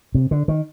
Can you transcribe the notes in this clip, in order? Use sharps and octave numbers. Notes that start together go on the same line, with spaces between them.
C3
D3
D#3